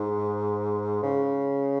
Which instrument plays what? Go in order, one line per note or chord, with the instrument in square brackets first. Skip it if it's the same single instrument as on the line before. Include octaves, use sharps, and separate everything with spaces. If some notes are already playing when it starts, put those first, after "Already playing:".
Already playing: [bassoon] G#2
C#3